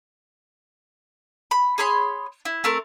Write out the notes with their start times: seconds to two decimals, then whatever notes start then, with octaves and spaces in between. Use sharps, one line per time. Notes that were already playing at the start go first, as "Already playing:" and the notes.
1.51 B5
1.78 G#4 C#5 B5 C6
2.45 E4
2.64 A3 C4 A#4